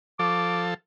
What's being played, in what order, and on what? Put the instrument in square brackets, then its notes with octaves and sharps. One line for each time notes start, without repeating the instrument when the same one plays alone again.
[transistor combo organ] F3 A4 [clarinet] D6